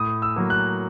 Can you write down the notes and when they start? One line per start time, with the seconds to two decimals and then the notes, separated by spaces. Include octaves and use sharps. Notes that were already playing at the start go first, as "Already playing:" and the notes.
Already playing: A2 D#6
0.22 E6
0.36 F#3 A#3
0.50 F#6